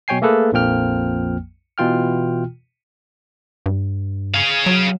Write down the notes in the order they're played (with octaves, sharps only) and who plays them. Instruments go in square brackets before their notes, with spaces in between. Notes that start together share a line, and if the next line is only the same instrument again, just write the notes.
[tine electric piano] B2 F#3 C#5 G5 G#5 C7
A3 A#3 G#4 A4 B4
A#1 F2 F3 A#3 G5 F6
B2 E3 F4 G5 F6
[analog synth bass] G2
[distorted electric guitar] G#4 F5
[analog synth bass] F#3